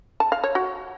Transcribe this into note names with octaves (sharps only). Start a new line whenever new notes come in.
A5
F5
C#5
F#4